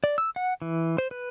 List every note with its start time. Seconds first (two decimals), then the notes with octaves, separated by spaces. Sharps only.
0.04 D5
0.18 E6
0.36 F#5
0.62 E3
0.98 C5
1.11 B4